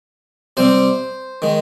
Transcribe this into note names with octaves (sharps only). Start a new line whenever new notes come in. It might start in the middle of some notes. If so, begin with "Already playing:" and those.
C3 G3 C4 C5
D#3 G#3